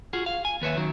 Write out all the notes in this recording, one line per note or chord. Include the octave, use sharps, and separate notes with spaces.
F4 F#4 G#4
F5
G#5
D#2 B4 C#5 E5
F#2 D#3 F#3